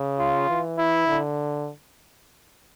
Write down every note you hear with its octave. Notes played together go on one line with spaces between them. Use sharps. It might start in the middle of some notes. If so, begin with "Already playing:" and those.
Already playing: C#3
F4
E3
E4
D3